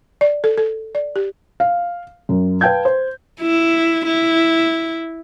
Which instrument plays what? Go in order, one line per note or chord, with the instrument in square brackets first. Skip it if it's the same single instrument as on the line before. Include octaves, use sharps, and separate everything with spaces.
[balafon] D5
A4
A4
D5
G4
[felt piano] F5
F#2
B4 F5 G5 A5 G6 G#6
C5
[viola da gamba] E4
E4